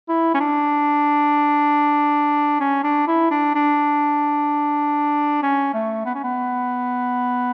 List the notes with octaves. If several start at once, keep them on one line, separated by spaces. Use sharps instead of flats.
E4
C#4
D4
C#4
D4
E4
D4
D4
C#4
A3
B3
C#4
B3